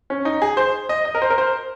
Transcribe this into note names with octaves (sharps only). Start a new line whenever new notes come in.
C#4
D#4
G#4
C5
D#5
D#5
A#4
C5
A#4
C5